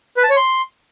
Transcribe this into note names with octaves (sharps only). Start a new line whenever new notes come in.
B4
A5
C#5
C6